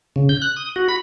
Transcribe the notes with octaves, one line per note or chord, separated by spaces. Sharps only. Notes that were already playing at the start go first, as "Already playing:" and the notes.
C#3
G6
F#6
D#6
F#4
B5